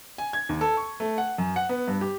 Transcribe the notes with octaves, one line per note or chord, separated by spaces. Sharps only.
G#5
G#6
D#2
A4
C#6
A3
F#5
F#2
F#5
B3
G2
G4